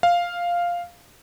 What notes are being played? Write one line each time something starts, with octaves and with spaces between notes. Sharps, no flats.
F5